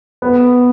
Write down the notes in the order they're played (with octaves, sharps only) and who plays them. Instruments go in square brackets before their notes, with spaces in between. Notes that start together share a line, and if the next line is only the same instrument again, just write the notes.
[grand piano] B3